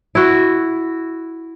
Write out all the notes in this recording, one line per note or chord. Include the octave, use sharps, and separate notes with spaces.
E4 F#4